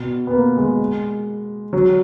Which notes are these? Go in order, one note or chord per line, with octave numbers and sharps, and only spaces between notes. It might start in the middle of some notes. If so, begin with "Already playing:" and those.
Already playing: B2
B3
A#3
G#3
F#3